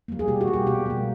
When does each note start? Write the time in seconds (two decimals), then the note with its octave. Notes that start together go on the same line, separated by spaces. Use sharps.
0.08 G3 A#3
0.19 G#4
0.28 B2 G4
0.41 F#4
0.47 G3 A#3
0.53 G4
0.66 B2 G4
0.86 G3 A#3